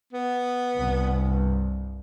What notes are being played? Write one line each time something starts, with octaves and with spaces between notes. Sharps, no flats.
B3
C2 G2